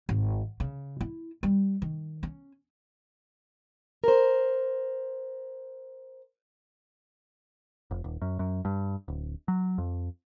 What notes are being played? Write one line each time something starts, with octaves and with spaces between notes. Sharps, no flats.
G#1
C#3
E4
G3
D#3
C#4
A#4 C5
F1
D#1
F#2
F#2
G2
D1
F#3
F2